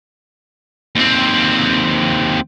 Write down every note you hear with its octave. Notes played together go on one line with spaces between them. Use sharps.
D#2 C4